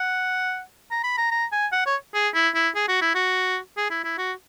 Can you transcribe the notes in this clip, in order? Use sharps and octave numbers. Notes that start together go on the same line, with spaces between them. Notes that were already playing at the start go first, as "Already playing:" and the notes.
Already playing: F#5
A#5
B5
A#5
A#5
G#5
F#5
C#5
G#4
E4
E4
G#4
F#4
E4
F#4
G#4
E4
E4
F#4